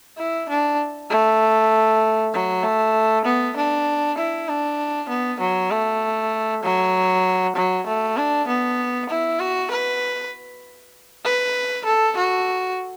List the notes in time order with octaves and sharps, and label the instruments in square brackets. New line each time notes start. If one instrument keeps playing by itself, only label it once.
[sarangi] E4
D4
A3
F#3
A3
B3
D4
E4
D4
B3
F#3
A3
F#3
F#3
A3
D4
B3
E4
F#4
B4
B4
A4
F#4